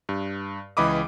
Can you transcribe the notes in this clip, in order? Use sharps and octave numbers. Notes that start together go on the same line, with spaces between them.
G2
C#2 E3 D#5 B5 D6 D#6